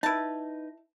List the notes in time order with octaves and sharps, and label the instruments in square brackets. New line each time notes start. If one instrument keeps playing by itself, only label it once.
[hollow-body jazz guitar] D#4 B4 [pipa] E4 A5